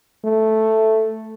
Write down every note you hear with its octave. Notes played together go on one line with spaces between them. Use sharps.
A3